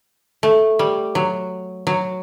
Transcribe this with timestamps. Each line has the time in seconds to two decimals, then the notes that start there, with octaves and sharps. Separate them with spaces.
0.43 A3
0.79 G3
1.15 F#3
1.87 F#3